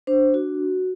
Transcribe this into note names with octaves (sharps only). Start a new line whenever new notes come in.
D4 C5
F#4